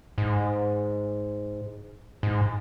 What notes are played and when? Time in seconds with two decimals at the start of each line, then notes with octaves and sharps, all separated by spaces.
0.18 G#2
2.23 G#2